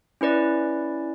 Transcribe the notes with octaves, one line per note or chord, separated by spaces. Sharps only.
C#4 E4 B4 D5